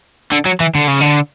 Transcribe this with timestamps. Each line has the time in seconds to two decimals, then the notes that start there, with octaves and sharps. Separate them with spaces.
0.32 D3
0.45 F#3
0.60 E3
0.75 D3
0.88 C#3
1.01 D3